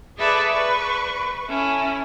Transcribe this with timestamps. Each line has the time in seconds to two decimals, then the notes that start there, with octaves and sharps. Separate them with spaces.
0.18 G#4 A4 B4 D5 E5 A5
0.51 B4 C#6
1.48 C#4 E4 A4